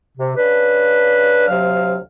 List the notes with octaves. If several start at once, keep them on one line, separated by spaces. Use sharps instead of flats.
C3
C#3 D4 B4
D2 C3 F#3 F5 F6